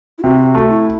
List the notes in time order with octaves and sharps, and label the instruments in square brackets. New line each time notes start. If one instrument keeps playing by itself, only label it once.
[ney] E4
[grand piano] C3 [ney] F#4
[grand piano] A3
[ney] E4